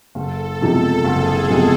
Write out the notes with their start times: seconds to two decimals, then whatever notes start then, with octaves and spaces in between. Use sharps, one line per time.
0.15 F#1 A4
0.61 E2 C3 F3 G#3
1.04 F#1 G#4
1.49 E2 C3 F3 G#3